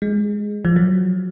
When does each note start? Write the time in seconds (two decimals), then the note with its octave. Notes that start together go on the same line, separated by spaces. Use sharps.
0.02 G#3
0.65 F3
0.76 F#3